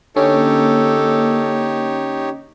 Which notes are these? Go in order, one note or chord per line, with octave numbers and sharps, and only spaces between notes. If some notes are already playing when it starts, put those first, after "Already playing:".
D3 A#3 C#4 D#4 G4 A4 C#5